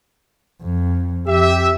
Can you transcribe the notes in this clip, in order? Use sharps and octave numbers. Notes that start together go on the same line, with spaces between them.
F2
F2 G4 E5